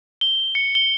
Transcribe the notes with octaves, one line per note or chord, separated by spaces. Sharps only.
G7
C#7
G7